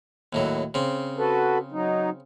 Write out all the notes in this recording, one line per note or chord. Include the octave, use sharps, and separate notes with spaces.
D#2 A2 F#3
C#3 C4
F#4 A4 B4
F#3 D#4